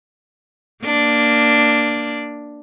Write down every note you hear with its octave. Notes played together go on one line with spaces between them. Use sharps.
A#3 D4